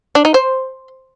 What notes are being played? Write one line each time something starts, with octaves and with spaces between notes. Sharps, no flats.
D4
D#4
C5